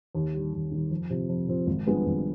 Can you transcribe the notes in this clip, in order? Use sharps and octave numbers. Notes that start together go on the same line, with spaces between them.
D#2
D#3 G3
D#2
D#3 G3
F2
C3 F3 C4
F2
C3 F3 C4
G#1
G2 F3 G#3 B3
G#1